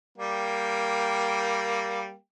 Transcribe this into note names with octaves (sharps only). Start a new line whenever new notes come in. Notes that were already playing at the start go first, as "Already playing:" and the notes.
G3 A#3 G5